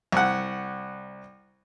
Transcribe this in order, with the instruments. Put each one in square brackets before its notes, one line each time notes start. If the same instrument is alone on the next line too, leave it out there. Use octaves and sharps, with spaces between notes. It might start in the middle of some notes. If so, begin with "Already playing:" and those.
[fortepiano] C2 F#5